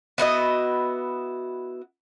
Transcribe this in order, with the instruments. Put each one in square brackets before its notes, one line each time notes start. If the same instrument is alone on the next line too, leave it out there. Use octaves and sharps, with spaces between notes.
[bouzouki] B3 E4 F#4 D#5